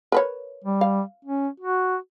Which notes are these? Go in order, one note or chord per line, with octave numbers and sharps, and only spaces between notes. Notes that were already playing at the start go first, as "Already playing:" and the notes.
A#4 B4 C#5
G3
F5
C#4
F#4